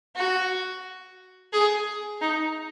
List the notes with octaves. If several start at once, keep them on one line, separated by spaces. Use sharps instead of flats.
F#4
G#4
D#4